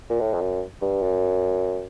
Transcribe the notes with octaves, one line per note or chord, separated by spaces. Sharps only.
A#2
A2
F2
F#2
G2
F#2